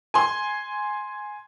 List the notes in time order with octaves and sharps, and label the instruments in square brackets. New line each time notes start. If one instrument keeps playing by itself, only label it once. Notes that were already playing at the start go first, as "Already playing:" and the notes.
[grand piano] G#5 C6